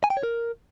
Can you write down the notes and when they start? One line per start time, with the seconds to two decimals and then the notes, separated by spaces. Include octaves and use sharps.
0.04 G#5
0.10 G5
0.17 C#5
0.23 A#4